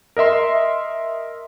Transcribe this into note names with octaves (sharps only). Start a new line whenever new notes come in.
A#4 D#5 E5 C6